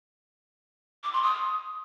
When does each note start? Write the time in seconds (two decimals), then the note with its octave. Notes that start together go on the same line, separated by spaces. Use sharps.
1.03 D6
1.13 C6
1.22 D#6